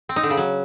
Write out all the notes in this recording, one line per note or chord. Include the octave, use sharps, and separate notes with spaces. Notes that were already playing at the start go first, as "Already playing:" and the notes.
C4
D#4
D3
C#3
F#3